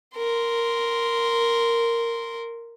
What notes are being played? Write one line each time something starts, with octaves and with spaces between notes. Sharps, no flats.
A#4 C6